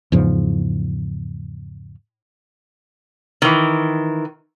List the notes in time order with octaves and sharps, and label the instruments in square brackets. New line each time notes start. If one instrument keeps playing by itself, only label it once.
[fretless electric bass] E2 G#2 C#3 F3
[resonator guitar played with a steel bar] D#3 E3